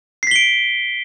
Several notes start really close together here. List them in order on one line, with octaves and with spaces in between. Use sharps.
C7 B6 G7 D7